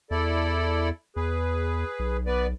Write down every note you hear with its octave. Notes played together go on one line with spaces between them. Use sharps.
E2 E4 A4 D5
E2 G#4 B4
B1
B3 B4 D5